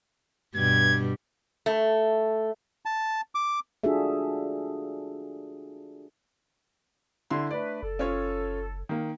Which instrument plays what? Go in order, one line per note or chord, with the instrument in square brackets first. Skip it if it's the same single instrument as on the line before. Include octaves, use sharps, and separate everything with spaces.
[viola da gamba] G2 B2 G3 [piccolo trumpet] G#6
[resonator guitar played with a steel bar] A3
[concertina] A5
D6
[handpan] D4 F4 F#4 G#4 A4 E5
[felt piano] D3 E4 C6
[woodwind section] A3 D4 B4 [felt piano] D5
[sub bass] F#1 [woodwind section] A4
[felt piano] C#4 F4 C#5
D#3 A#3